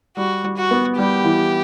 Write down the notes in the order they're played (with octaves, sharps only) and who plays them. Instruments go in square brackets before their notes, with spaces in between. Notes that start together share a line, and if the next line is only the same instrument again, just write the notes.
[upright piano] G3 [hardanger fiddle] F#4
[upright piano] G3
[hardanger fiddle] F#4
[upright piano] B3
[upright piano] G3 [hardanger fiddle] G4
[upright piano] E3